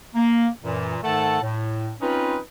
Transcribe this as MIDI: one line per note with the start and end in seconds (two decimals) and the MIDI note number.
0.15 0.47 58
0.62 0.97 42
0.62 0.97 46
0.62 0.97 52
1.02 1.39 44
1.02 1.39 51
1.02 1.39 57
1.02 1.39 69
1.02 1.39 78
1.02 1.39 81
1.41 1.92 45
2.00 2.38 60
2.00 2.38 61
2.00 2.38 63
2.00 2.38 65
2.00 2.38 71